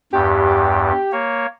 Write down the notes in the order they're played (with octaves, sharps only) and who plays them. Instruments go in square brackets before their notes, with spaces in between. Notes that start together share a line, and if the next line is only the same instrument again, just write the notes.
[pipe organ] E2 G2 [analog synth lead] G4
[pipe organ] A#3 C#5